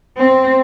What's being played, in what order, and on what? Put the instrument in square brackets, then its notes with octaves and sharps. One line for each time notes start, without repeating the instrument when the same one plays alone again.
[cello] C4